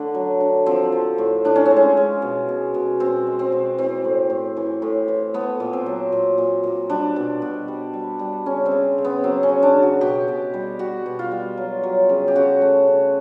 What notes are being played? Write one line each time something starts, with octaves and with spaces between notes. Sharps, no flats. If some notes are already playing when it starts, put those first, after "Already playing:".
Already playing: D3 A3 D4
F#3
D3
F3 C4
F3
A2
A2 D4
C#4
C4
G#3
C#4
G#3
B2
B2
B2
B2 C4
G#3
C4
B2
E3 C4
A2
A2
E3
A2
E3
A3 B3
A#2
C4
F#3
A#2
A#2
A#2
G3 D4
B2
B2
G3
G3
G3
C#3 C#4
C4
C#3
C#3
B3
F#3 C4
C#4
C#3
D4
C#3
F#4
B2 G4
B2
G3
G3 F#4
B2
F4
G3
F#3
F#3
C#3
G4
C#3 F#4
A3
C#3